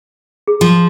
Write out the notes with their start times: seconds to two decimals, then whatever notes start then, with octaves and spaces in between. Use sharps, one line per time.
0.48 G#4
0.61 F3